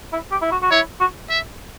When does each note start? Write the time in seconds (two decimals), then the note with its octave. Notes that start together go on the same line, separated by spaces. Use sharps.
0.13 E4
0.32 G4
0.42 E4
0.52 F#4
0.62 F#4
0.71 E4 C#5
1.00 F#4
1.30 E5